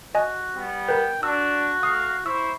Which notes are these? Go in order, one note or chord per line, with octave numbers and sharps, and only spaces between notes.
F#4 D#5 G#5
G3 B3
A#4 B4 G5
D4 F#4 E6
A3 F5 D#6
E4 C5 C#6 E6